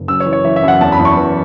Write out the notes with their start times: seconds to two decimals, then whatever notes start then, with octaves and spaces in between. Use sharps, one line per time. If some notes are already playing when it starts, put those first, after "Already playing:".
Already playing: F#1
0.08 F#2 E6
0.20 C#5
0.26 E3
0.33 C#5
0.44 E3 E5
0.56 E5
0.63 F#2
0.68 F#5
0.81 E2 A5
0.92 B5
0.99 E2
1.05 C#6
1.17 E3